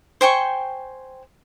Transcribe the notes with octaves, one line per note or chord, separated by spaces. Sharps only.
C5 G5 G#5 C#6